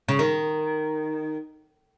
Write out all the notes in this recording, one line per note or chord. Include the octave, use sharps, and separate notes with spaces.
C#3
D#3